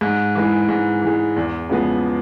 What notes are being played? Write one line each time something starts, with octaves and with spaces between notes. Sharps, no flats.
G#2
E3 G#3
G#2
E3 G#3
E2
C#3 F3 G#3 B3